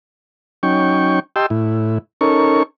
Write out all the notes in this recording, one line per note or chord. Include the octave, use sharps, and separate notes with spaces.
F#3 C#4 D#4 G5 C#6
G4 D#5 G5 A5 C6 E6
A2 E4
C#4 D#4 A4 A#4 C#6